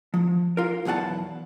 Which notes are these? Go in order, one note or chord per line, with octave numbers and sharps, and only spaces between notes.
F3
F4 A#4
B1 E2 B2 F#5 A5